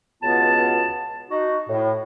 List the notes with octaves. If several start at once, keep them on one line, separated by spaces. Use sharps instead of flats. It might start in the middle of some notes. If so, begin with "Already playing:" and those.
C#2 B2 B3 F4 A5
D#4 F#4
A2